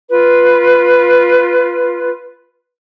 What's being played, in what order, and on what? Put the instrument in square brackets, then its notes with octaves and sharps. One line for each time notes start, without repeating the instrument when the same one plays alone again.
[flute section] F4 B4